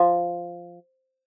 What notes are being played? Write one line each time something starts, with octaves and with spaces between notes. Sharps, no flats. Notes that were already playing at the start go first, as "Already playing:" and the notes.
Already playing: F3